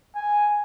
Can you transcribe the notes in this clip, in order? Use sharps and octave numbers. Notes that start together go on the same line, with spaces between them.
G#5